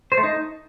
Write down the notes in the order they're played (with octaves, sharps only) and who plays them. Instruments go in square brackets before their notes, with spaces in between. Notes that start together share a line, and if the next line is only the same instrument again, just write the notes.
[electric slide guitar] C5
A3
D#4